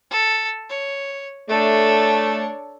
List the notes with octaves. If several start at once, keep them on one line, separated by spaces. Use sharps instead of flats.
A4
C#5
A3 D4 A4 C#5